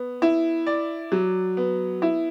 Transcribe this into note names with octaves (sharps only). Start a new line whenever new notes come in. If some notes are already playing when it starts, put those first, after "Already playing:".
Already playing: B3
E4
D5
F#3
B3
E4